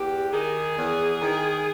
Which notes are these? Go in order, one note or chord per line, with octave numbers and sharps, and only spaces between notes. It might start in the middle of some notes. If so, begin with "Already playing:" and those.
Already playing: E2 G4
D#3 G#4
E2
D#3